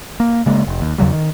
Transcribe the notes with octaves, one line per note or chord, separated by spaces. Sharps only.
A#3
C#3 G#3 A#3
F1
D#2
E2 C#3 F#3 G3
D#3